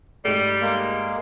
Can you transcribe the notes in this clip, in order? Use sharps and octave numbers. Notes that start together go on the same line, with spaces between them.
G#2 G3 A3
G#3 A#3